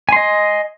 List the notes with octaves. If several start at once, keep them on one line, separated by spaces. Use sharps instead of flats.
D#5 G#5 C6